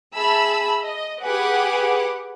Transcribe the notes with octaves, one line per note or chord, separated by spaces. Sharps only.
G#4 E5 A5 B5 E6
D#5
G4 G#4 B4 F#5 G#5 D6